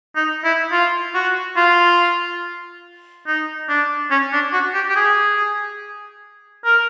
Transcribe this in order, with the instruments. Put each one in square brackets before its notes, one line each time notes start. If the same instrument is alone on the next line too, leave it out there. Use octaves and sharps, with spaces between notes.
[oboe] D#4
E4
F4
F#4
F4
D#4
D4
C#4
D4
F#4
G4
G4
G#4
A#4